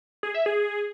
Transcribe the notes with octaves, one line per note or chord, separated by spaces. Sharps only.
G#4
E5
G#4